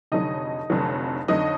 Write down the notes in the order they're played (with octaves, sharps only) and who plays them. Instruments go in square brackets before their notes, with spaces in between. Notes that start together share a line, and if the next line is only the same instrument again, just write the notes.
[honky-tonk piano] F1 F2 D3 F#3 D#4 D#5
F1 F2 D3 F#3
F2 D3 F#3 D#4 D#5